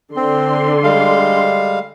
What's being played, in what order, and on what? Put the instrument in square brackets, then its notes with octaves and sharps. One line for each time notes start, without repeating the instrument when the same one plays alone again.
[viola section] D3 C6 [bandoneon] C4
[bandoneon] G3 G#3 F5